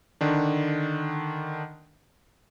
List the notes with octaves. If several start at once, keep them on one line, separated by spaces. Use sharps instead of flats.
D3 D#3 D4